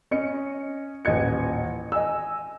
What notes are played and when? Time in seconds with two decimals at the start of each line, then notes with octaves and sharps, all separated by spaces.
0.11 C#4 D#5 C#7
1.05 D#1 A1 D#5 G#6 C#7
1.92 D#5 G#5 E6